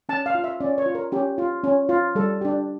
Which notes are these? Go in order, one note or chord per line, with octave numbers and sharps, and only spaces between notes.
C#4 A5
F5
F4
E5
C#4 D5
C#5
F4
A#4
C#4 G4
F4
C#4
F4
G3 A4
D4 G4